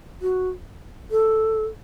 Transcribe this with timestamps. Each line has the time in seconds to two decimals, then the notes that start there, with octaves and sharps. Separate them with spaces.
0.22 F#4
1.11 A4